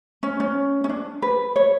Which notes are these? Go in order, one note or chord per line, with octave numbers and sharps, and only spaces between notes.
C#4
C#4
C#4
D4
B4
C#5